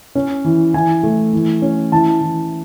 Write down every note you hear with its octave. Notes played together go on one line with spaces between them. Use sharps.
C#4
E3
E3 G#5
A3
E3
C#4
E3 A5
E3